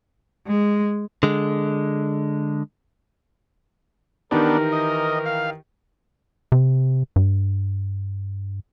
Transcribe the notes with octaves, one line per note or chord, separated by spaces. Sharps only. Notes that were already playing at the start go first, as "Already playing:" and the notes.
G#3
D3 G#3
D#3 E3 B3 D4 D#4 G4 A#4
D#5
F5
C3
G2